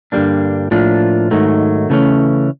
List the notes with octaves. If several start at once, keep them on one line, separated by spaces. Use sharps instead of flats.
G2 D3 G3 A#3 D4
A2 F3 A#3 D4 F4
G#2 D#3 F#3 A3
C#3 E3 A3 C#4